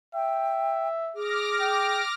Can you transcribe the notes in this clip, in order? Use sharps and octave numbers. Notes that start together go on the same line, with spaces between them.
E5 G5
G#4 D6 F6 A#6
G5